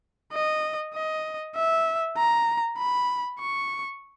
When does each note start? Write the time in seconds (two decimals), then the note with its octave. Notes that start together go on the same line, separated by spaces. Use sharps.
0.33 D#5
0.94 D#5
1.56 E5
2.17 A#5
2.78 B5
3.39 C#6